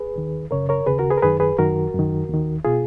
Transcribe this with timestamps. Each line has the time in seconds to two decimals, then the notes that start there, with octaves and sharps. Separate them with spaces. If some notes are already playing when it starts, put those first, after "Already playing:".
Already playing: G#4 B4
0.16 D#2 D#3
0.51 F#2 C#3 A#4 C#5
0.69 A#4 C#5
0.86 D#2 C#3 G#4 B4
0.99 F#4 A#4
1.11 G#4 B4
1.17 A#4
1.22 F#2 D#3 G#4 B4
1.40 G#4 B4
1.58 F#2 D#3 F#4 A#4
1.94 F#2 D#3
2.30 D#2 D#3
2.65 B2 F4 G#4